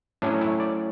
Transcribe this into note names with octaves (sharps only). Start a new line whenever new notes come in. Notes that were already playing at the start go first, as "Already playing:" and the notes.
A2 F#3 C#4 D4
E4
D5